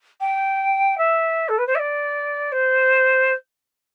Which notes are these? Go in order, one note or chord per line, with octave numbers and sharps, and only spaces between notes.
G5
E5
A4
B4
C5
E5
D5
C5